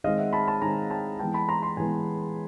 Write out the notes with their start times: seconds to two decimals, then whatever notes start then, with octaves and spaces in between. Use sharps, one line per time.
0.04 D#3 G#3 C4 D#5 F5
0.18 E5 F#5
0.33 A5 B5
0.48 A5 B5
0.62 D#3 G#3 C4 G#5 A#5
0.91 G5 A5
1.19 E3 G#3 B3 G5 A5
1.34 A5 B5
1.49 A#5 C6
1.63 A#5 C6
1.77 E3 G#3 B3 G#5 A#5